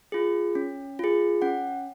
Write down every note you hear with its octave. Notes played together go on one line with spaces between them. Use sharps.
F4 G#4
C#4
F4 G#4
C#4 F#5